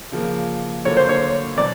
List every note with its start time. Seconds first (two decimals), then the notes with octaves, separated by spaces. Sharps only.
0.12 C#3 F3 A#3
0.85 D3 F#3 A#3 C#5
0.97 C5
1.09 C#5
1.56 B2 F#3 D5